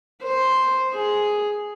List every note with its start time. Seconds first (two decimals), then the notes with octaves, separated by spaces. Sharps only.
0.24 C5
0.94 G#4